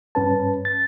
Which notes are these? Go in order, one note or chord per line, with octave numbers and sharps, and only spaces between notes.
G2 C#4 B4 A5
A6